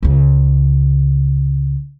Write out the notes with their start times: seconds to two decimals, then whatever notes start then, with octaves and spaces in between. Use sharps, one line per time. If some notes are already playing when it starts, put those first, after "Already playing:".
0.03 C#2 C#3